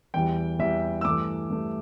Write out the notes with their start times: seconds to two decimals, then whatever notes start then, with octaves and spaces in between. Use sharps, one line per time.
0.14 E2 E3 G3 G5
0.59 E2 E3 G3 E5
1.01 E6
1.05 G2 E3 A3 D6
1.50 G2 E3 A3